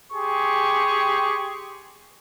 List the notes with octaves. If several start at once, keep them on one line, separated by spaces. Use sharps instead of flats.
G4 G#4 C6 C#6